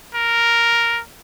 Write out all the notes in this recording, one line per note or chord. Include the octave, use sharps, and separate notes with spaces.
A#4